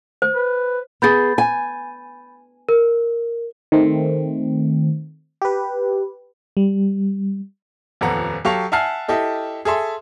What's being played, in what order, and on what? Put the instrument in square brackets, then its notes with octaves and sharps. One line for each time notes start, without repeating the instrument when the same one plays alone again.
[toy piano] C5
[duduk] B4
[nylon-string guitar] B3 G#4 [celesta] B5 G6 A6
[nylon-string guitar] G#5
[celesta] A#4
[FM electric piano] D#3 A3 C4
G4 B4
G3
[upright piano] D#1 F2 B3 A4 F#5 A#5
F#3 G4 A4 F5 C#6 F7
E5 F#5 G#5 A5 F6 C7
E4 G4 A4 D#5
G#4 A4 E5 C6